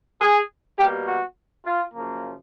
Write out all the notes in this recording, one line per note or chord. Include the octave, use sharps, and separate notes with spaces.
G#4
B2 G3 A#3 G4
F#4
F4
F#2 C#3 F3 A#3